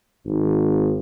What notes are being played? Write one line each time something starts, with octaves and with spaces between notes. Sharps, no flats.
G#1